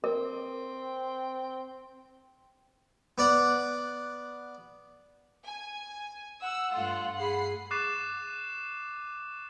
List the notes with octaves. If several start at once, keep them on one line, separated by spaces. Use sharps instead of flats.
C4 A#4
B3 D5 F#5
G#5
F#5 E6
G2 A3 F4
G#4 B5 C7
C#6 D6 F#6 A6 C7 E7